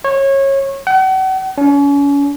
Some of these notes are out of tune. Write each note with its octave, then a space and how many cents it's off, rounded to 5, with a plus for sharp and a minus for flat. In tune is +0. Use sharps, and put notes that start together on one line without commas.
C#5 -25
F#5 +40
C#4 +35